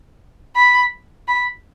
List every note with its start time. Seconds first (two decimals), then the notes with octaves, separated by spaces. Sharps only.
0.56 B5
1.28 B5